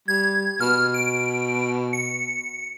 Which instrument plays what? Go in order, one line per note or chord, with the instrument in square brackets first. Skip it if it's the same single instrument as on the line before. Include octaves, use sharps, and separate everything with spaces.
[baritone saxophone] G3 [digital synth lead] G#6
[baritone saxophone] B2 [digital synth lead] F6
[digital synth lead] D7
C#7